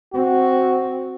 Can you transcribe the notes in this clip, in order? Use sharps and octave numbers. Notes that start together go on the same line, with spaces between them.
C4 F#4